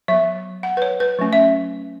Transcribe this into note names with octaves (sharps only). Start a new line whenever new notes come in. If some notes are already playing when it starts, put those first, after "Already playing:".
F#3 B3 E5
F#5
B4
C#5
B4
F#3 A3 C#4
E5